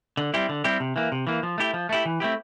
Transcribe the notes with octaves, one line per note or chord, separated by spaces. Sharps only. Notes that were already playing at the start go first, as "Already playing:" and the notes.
D3
G3 C4 E4 G4
D3
G3 C4 E4 G4
C3
E3 A#3
C3
E3 A#3
F3
A3 E4 G4
F3
A3 E4 G4
E3
A3 C4 E4 G4